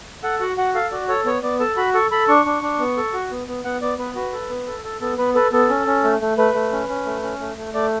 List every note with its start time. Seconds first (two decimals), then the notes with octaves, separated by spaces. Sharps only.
0.23 A4 F#5
0.40 F#4 F#5
0.58 F#4 F#5
0.75 A4 F5
0.92 F#4 D5
1.08 A4 C#5
1.25 B3 C#5
1.43 B3 D5
1.60 A4 A5
1.77 F#4 B5
1.94 A4 C#6
2.11 A4 B5
2.28 D4 C#6
2.46 D4
2.62 D4
2.80 B3
2.97 A4
3.13 F#4
3.31 B3
3.47 B3
3.65 B3 F#5
3.82 B3 D5
3.98 B3 B4
4.16 F#4 B4
4.33 A4
4.50 B3
4.67 A4
4.84 A4
5.01 B3 A4
5.18 B3 B4
5.35 A4 B4
5.52 B3 A4
5.69 C#4
5.86 C#4
6.04 A3
6.21 A3
6.38 A3 B4
6.54 A3
6.72 C#4
6.89 C#4
7.06 A3
7.23 C#4
7.40 A3
7.57 A3
7.74 A3 D5